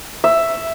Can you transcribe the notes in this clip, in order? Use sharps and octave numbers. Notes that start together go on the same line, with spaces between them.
E5